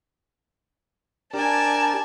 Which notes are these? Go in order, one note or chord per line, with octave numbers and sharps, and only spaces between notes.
D4 G4 A#4 D5 G#5 A5 E7